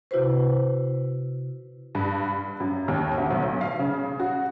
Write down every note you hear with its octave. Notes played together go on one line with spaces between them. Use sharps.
C3 E4 F#4 B4 C5
G2
B5
F#2
D#2
D2
B1
F5
C#3
F#4